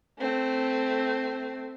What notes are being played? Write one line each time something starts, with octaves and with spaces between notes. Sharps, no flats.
A3 C4